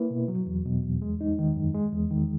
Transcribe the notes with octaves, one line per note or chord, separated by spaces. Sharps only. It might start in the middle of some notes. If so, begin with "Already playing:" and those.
Already playing: A#3 E4 B4
B2
F#3
E2
B2
E2
G#3
D#4
D#3
F#2
G#3
E2
D#3